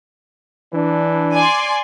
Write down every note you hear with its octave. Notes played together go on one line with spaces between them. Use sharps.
E3 D4
D5 G#5 C6